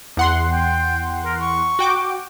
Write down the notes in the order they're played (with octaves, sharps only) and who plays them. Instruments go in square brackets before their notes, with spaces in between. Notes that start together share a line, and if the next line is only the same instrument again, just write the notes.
[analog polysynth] E2 F#5 C6
[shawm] G5
A#4
C#6
[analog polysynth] F#4 G5 D6